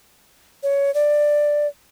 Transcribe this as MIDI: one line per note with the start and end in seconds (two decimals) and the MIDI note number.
0.63 0.93 73
0.94 1.67 74